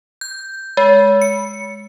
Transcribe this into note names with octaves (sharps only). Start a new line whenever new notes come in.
G6
G#3
C#7